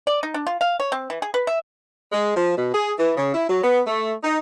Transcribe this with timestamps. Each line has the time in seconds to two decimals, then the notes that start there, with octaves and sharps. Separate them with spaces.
0.07 D5
0.23 D#4
0.34 D4
0.47 F4
0.61 F5
0.80 C#5
0.92 C4
1.10 E3
1.22 G#4
1.34 B4
1.47 E5
2.13 G#3
2.36 F3
2.57 B2
2.74 G#4
2.98 E3
3.17 C#3
3.34 E4
3.50 F#3
3.63 B3
3.87 A3
4.23 D#4